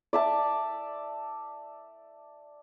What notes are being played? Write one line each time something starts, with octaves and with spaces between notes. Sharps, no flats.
D5 E5 A5